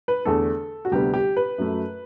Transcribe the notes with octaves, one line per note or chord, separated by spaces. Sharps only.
B4
E2 D3 A3 A4
F#4
D2 C3 G3 B3 G4
G4
B4
F#2 F#3 A3